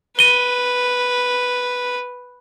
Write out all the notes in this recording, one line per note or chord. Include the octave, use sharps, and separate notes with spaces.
B4 D#7 G7